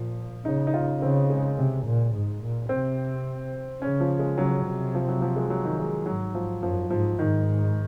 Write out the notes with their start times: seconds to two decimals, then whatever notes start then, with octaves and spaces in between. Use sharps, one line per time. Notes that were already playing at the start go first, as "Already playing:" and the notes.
Already playing: A#2 F3
0.45 C#3 D#4
0.67 D#4
0.74 F4
1.01 C#3 C4
1.30 G#3
1.57 C3
1.86 A#2
2.13 G#2
2.42 A#2
2.69 C3 C4
3.81 C#3 C#4
4.00 F3
4.19 G#3
4.38 C#3 F#3
4.67 C3
4.95 F3
5.08 F#3
5.22 F3
5.36 G#3
5.50 F#3
5.65 D#3
5.79 G#3
6.06 G#2 F#3
6.35 F3
6.63 F#2 F3
6.90 G#2 F3
7.18 G#2 D#3